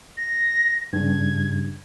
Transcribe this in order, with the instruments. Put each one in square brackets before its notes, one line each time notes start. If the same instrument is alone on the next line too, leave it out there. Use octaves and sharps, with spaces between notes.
[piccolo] A#6
[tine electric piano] G2 C#3 [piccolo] G#6